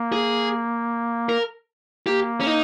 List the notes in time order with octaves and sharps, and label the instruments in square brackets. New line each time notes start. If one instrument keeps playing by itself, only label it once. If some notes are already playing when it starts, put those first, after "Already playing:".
Already playing: [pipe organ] A#3
[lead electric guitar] G#4
A#4
[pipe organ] A#3 [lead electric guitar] G4
[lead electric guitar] C#4
D#4